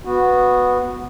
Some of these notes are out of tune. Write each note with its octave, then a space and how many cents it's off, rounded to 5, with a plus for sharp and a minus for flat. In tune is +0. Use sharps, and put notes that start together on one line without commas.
B3 +0 F#4 -15